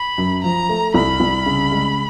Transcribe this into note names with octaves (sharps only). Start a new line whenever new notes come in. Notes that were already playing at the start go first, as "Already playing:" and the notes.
Already playing: B5
F#2
F3 A#5
A3
C2 B5
C2
C#3
G#3